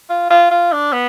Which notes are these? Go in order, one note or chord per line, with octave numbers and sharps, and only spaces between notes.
F4
F4
F4
D4
B3